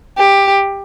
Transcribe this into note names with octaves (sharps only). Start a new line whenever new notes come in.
G4